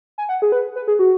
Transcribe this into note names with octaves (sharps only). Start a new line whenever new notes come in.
G#5
F#5
G#4
B4
B4
G#4
F#4